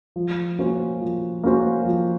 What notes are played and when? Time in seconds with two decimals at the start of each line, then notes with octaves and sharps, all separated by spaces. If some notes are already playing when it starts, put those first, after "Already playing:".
0.16 F3
0.59 A#3 C#4 F#4 C5
1.01 F3
1.44 A#3 C#4 F#4 C5
1.85 F3